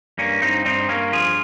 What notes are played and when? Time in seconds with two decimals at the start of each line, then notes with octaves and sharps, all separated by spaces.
0.18 G2 A#3 C#4
0.42 G2 C4 D#4
0.65 G2 C4 D#4
0.89 G2 A#3 C#4
1.12 F3 F4 G#4